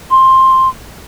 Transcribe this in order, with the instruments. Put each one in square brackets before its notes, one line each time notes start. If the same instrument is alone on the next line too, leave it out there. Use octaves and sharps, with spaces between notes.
[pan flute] C6